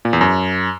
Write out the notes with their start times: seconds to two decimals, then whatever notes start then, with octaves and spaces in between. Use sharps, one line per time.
0.05 A#2
0.13 E2
0.21 F#2